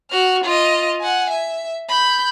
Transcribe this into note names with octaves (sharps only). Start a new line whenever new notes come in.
F#4 F6
F4 D#5
F#5 G#5
E5
B5 G6